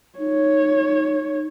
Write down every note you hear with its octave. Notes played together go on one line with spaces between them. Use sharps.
D#4 C#5